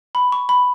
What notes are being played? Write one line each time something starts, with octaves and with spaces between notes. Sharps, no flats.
B5
C#6
B5